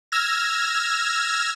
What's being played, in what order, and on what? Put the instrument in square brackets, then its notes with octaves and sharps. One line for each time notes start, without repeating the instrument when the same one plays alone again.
[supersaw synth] E6 F6 G#6 A#6